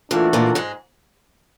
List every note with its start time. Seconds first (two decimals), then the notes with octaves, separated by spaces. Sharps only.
0.10 A#2 E3 A3 A#3 D4 F#4 A4
0.33 A#2 A#3
0.55 G#2 G#3